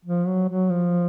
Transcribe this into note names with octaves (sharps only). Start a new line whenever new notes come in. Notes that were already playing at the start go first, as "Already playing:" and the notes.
F3
F#3
F#3
F3